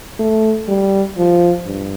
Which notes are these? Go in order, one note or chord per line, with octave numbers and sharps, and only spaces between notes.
A3
G3
F3
G2